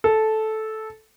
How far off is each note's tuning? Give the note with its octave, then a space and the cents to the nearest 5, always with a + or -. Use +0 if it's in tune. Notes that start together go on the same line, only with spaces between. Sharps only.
A4 -10